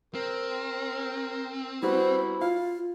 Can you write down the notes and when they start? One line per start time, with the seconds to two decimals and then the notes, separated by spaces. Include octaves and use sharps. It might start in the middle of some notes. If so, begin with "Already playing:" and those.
0.15 C4 A#4
1.82 G3 B3 E4 F#4 C5
2.42 F4 F5